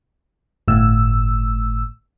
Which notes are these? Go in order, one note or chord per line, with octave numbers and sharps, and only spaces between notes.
G1 A2 E6